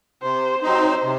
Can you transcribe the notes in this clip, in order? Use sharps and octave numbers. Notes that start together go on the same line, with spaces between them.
C3 C5
F#3 C4 D#4 C5
C3